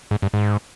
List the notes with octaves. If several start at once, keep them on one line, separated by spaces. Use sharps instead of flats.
G#2
G2
G#2